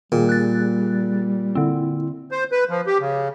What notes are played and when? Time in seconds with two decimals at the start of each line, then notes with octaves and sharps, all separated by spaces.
0.12 A#2 D#3 G3 G#4
0.29 F#6 A6
1.55 D3 C4 E4
2.31 C5
2.52 B4
2.69 F3
2.87 G4
3.00 C#3